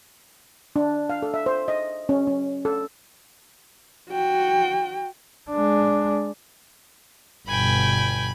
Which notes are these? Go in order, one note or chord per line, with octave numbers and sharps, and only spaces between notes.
D4
F5
A4
E5
C5
D#5
C#4
C#4
A4
F#4 G5
G#3 D4
G1 B2 G5 G#5 B5